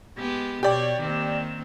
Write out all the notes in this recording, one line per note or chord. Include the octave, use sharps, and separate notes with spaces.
G#3 B3 G4
B2 G4 C#5 D5
D#3 A#3 C4